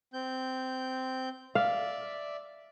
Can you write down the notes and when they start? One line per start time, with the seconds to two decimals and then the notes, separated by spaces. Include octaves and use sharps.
0.13 C4 G6
1.55 D5 E5 F5